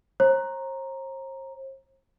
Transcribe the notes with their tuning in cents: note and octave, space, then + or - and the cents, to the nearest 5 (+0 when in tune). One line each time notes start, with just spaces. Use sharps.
C5 +40 A#5 +0